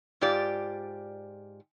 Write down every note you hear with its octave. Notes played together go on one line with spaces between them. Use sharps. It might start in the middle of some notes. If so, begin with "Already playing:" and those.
G#2 F4 G4 D5